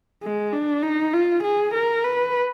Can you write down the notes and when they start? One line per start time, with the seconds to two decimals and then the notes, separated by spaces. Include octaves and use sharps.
0.23 G#3
0.53 D4
0.83 D#4
1.14 F4
1.44 G#4
1.74 A#4
2.04 B4